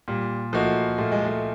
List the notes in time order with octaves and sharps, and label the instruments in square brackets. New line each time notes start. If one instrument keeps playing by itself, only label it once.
[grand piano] A#2 [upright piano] G3
[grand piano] F3 A#3 D#4 F#4 [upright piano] A3
[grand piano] A#2 [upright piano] A3
[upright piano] G#3
A3